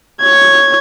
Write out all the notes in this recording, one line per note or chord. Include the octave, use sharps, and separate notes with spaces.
C#5 G#6